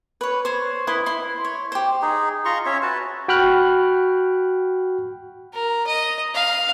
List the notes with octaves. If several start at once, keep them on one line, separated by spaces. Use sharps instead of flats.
B4 C#5
C5 C#5
E4 B4 C6 D#6
E4 C6
C#5
G4 C5
D#4 G#4
F4 A#5 C6 C#6
C#4 C#5 E5
F#4 B4 A5
F#4 G5 B5 F6 F#6
A#4
D#5
F5